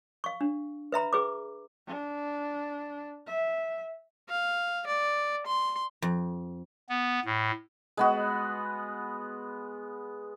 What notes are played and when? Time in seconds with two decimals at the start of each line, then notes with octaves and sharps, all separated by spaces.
0.24 F5 C#6
0.41 D4
0.92 B4 E5 A#5 B5
1.13 G#4 B4 D6
1.87 D4
3.27 E5
4.29 F5
4.87 D5
5.47 C6
6.02 F2
6.89 B3
7.25 A2
7.97 G#3 B3 F#4